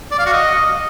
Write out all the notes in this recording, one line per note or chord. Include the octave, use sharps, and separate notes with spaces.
D5
F5
F#4
D#5